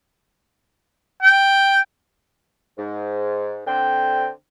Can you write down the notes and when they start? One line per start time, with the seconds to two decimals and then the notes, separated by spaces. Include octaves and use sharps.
1.22 G5
2.78 G#2
3.67 D3 C4 G5